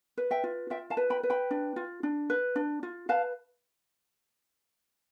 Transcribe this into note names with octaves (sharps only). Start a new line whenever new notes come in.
B4
E5 G5
F4
F4 E5 G5
F5 A5
B4
G5 B5
B4
G5 B5
D4
F4
D4
B4
D4
F4
B4 F5 A5